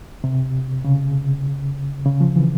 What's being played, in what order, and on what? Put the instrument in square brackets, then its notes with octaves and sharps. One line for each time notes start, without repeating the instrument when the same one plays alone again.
[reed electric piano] C3
C#3
C#3
F3
E3